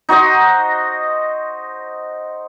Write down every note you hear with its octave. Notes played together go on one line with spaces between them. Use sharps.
D#4 F#4 C5 D#5